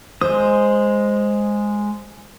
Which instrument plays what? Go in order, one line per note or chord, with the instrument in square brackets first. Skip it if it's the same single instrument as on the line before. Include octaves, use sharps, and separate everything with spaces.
[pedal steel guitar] G#3 D#6 [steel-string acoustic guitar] C5